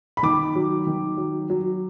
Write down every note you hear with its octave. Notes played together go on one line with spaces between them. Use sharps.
B5
D#3 D6
F#3
D#3
F#3
F#3